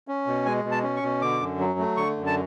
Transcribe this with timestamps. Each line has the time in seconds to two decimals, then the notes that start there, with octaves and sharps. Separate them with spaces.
0.08 C#4
0.27 B2
0.46 G#3 G#5
0.64 B2
0.71 A5
0.83 C#4
0.96 C#6
1.03 B2
1.22 D3 D6
1.41 F#2
1.59 F#3
1.79 A3
1.97 D3 C#6
2.17 F#2
2.26 A5